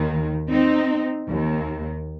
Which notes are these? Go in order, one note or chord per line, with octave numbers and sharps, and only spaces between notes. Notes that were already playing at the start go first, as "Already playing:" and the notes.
Already playing: D#2 D#3
C4 D#4
D#2 D#3